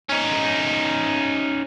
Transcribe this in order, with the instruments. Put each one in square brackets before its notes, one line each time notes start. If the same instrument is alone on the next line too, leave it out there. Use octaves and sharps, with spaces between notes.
[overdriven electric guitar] C#4 D#4